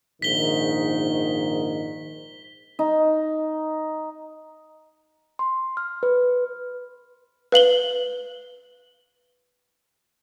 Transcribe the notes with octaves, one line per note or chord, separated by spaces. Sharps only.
A#1 G#2 D#3 B6 G7
D#4
C6
F6
B4
B4 F5 F#7 G7